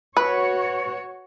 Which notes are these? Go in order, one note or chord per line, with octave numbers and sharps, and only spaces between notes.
F#4 B4 C#5